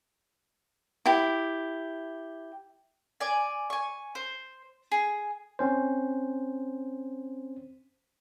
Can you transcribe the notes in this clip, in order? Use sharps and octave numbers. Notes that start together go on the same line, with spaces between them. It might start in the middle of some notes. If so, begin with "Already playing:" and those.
E4 G4
D5 G#5
G#5 C#6
C5
G#4
C4 C#4 C5